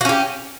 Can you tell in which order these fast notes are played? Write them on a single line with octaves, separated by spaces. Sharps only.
F#4 C#4 G4